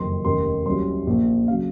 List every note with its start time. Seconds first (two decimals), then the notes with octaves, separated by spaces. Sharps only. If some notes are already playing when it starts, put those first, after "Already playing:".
Already playing: F#1 F2 C3 D#3 C6
0.25 F1 D#2 D#3 A#3 C#4 C6
0.66 C2 C3 F#3 C#4 C6
1.07 A#1 A#2 F3
1.48 C#3 F#3 F5